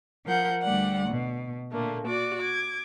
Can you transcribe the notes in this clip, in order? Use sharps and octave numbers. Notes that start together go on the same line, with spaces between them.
F3 A#4 F#5 G6
D2 G3 D5 F#5
B2
A#2 D3 A3 A#3
F#4 D5 D6
D6 G#6